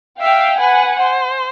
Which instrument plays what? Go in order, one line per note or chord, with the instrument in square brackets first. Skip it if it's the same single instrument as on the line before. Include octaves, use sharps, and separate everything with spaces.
[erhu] E5 [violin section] F5 G5
[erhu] B4 [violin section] F#5 G#5
[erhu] C5